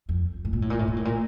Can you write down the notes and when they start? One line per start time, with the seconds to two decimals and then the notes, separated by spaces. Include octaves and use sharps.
0.09 F2
0.45 A2
0.53 A#2
0.62 A2
0.70 A#2
0.79 A2
0.88 A#2
0.96 A2
1.05 A#2